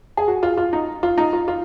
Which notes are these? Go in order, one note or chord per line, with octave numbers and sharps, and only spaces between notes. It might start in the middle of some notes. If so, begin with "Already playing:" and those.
G#4
F#4
F4
F4
D#4
F4
D#4
F4
F4